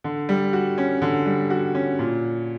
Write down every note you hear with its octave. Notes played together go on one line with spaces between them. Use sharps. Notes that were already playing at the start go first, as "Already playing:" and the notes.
D3
G3
F#4
C#4
D3
G3
F#4
C#4
A#2